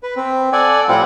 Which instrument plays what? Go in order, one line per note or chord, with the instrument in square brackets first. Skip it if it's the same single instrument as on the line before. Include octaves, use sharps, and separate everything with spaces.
[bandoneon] B4
C4
[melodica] A4 F#5 [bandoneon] D5 G#5
[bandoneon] A2 F3 F4 [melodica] G3 C4 F#5